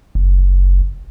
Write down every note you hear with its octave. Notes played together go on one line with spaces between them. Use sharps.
F#1